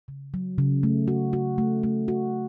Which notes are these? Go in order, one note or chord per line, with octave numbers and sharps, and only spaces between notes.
C#3
F#3
C#3
A3
F#4
F#4
A3
A3
F#4